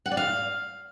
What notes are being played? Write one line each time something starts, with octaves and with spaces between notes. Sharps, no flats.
F#5
D5
F5